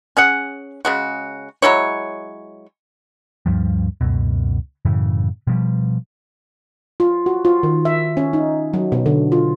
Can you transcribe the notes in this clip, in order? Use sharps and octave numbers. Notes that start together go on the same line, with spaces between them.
C#4 G#4 F#5
C#3 G#3 F#4
F#3 G#3 E4 C#5
D2 G2 F3 G3
C#2 F#2 B2
F#2 A2 C#3 E3
B2 F3 G3
F4
F#4
F4
D#3
E5
C#4
D#4
F#3
B2
D3
F4